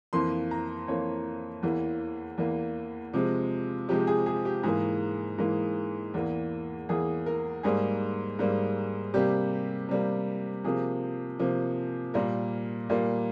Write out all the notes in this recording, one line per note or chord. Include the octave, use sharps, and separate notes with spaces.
F2 E3 A#3 C6
A#5
F2 E3 A#3 C#5
E2 E3 A#3
E2 E3 A#3
C3 F3 G#3
C3 F3 G#3 G4
G#4
G#4
G4
G#2 E3 A#3 G#4
G#2 E3 A#3
E2 E3 A#3
E2 E3 A#3 G#4
A#4
G#2 G3 A#3 G#4
G#2 G3 A#3
C3 G3 A#3 G4
C3 G3 A#3
C3 F3 A#3 G#4
C3 F3 A#3
A#2 G3 A#3 A#4
A#2 G3 A#3